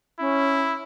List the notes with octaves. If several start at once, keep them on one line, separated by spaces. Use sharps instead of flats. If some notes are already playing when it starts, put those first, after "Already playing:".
C#4 E4